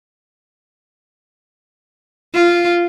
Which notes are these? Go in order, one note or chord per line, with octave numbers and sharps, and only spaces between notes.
F4